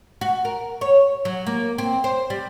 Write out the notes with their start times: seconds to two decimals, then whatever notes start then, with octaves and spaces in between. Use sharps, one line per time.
0.21 F#4
0.45 A#4
0.81 C#5
1.25 F#3
1.47 A#3
1.78 C4
2.04 C5
2.30 G3